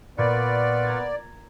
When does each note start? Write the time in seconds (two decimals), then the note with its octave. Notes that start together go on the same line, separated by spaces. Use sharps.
0.18 A#2 B3 F4 B4 D5 C#6 G#6
0.85 A#5 G#6 A6